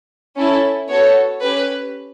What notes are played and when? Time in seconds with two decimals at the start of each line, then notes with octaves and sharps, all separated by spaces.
0.36 C#4 E4 A4
0.89 B3 F#4 A4 C#5
1.42 C#4 G4 B4